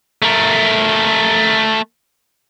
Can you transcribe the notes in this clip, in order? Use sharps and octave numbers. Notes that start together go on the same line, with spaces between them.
A3 A#4